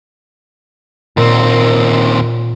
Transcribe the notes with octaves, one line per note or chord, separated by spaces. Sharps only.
D#2 A#2 C4